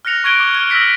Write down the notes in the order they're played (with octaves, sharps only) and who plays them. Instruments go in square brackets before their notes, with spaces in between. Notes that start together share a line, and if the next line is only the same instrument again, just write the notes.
[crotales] F6 F#6 A#6 C#7 F7
C#6 F#6 G#6 D7 G7
D6
F6 G#6 G7
E6 F6 A#6 B6 C#7